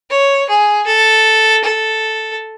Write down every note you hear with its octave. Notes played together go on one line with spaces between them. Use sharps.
C#5
G#4
A4
A4